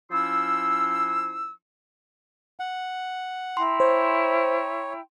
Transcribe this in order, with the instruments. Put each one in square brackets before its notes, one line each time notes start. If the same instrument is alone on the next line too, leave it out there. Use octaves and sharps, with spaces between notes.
[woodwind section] F3 C#4 E4 C6 E6
[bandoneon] F#5
[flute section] E4 G5 A#5 [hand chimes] C6
[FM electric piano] C5 [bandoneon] C#5